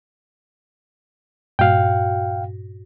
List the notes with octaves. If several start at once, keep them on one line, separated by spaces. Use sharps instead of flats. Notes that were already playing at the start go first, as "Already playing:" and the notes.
G2 A#2 F#4 F5 G5